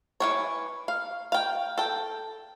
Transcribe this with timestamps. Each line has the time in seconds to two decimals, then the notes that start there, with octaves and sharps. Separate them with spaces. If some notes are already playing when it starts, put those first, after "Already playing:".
0.20 E3 C4 C#5
0.88 F5
1.32 F5 G5
1.78 A4 G5